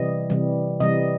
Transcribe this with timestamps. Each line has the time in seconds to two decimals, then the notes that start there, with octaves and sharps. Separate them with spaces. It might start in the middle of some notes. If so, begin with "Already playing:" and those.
Already playing: C3 E3 G3 D#5
0.30 C3 E3 G3
0.80 C3 E3 G3 D#5